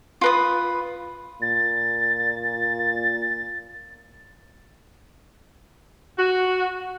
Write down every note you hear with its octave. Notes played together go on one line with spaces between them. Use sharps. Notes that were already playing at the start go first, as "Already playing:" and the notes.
F4 B4 D#6
A#2 A6
F#4